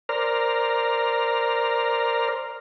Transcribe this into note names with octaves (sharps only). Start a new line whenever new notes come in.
A#4 C5 D5 A#5 F6